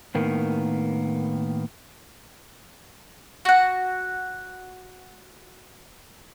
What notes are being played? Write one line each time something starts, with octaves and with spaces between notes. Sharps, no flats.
A2 D#3 A#3 B3
F#4 F#5